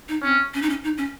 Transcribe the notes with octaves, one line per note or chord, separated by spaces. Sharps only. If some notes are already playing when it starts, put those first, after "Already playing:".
D#4
C4 C#4
C#4
D#4
C#4
D#4
C#4